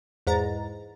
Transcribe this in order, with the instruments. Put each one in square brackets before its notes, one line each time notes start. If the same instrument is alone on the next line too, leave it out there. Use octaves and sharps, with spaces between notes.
[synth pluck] E2 G#2 A#5 A6